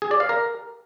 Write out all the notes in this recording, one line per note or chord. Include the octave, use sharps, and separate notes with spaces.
G#4
D5
F5
A#4